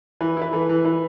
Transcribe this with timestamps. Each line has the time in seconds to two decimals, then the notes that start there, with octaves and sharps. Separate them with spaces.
0.21 E3 B4
0.37 E4 B4
0.52 E3 A4
0.69 E3
0.85 E3 B4